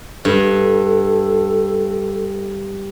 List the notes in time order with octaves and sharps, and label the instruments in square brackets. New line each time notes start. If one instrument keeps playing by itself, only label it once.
[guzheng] G2 [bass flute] A4